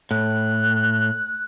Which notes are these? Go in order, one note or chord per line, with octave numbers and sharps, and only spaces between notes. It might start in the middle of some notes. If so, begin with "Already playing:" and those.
A2 F#6